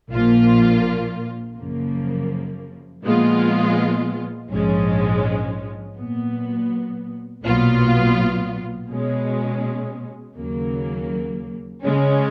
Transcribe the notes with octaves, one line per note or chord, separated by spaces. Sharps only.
A#1 A#2 F3 A#3 F4
F#2 C#3 F3 A#3
A#2 F3 G#3 B3 F4
A#1 G#2 F3 G#3 C#4
A#2 F#3 B3
B1 A#2 F#3 B3 F4
B2 G#3 C#4
D#2 C#3 F#3 A#3
C#3 G#3 C#4